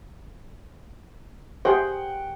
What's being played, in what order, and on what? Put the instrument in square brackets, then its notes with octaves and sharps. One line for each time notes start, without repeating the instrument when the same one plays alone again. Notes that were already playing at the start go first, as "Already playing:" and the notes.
[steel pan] G4 G#4 C5 [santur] F#5 G5